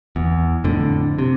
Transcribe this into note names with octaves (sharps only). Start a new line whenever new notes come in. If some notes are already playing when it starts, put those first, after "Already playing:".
E2
F2 A2 D3
C3